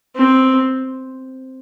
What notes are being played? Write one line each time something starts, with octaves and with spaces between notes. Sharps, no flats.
C4